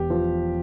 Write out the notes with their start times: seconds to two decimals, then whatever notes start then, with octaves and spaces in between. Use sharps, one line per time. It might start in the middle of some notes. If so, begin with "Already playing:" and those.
Already playing: E1 G4
0.10 F3